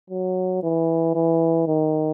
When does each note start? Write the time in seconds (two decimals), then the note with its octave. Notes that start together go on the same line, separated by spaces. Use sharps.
0.10 F#3
0.63 E3
1.15 E3
1.67 D#3